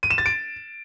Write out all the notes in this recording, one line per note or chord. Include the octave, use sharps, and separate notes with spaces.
D#7
E7
A6
D7